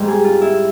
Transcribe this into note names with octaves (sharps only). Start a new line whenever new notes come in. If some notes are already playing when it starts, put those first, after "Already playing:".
Already playing: G#2 G3
G#4
F4
E4